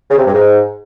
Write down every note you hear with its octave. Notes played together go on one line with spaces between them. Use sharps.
C#3
C3
G2
G#2